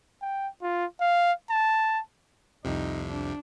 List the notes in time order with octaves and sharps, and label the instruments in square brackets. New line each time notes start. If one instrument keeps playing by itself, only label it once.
[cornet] G5
F4
F5
A5
[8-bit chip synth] C2 F2 C3 [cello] D#4
[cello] D4